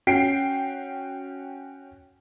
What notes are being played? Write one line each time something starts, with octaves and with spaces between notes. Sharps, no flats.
C#4 F#4 G5 C7 D7